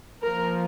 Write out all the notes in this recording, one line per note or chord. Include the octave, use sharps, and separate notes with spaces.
F3 A#3 A#4